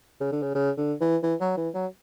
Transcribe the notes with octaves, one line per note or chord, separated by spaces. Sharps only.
C#3
D3
C#3
C#3
D3
E3
E3
F#3
E3
F#3